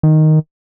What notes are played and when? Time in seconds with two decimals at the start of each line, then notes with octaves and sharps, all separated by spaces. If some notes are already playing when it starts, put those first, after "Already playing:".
0.03 D#3